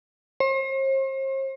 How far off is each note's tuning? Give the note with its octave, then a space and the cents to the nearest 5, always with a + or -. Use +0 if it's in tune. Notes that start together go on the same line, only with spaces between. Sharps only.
C5 +40